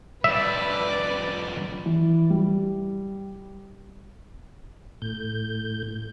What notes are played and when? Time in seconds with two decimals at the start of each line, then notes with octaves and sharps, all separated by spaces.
0.24 F2 G3 B4 D5 E5
1.86 E3
2.30 G3
5.02 A2 G6